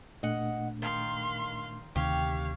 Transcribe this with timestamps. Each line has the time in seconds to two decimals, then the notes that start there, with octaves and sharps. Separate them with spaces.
0.23 A#2 A3 D4 D#5 F#5
0.82 D#3 F5 C6
1.96 D2 C3 D#3 G4 C#5 F5